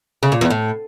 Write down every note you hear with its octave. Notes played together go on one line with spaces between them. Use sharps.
C#3
A#2
E2
A2